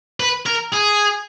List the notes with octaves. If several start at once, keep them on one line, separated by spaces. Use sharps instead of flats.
B4
A#4
G#4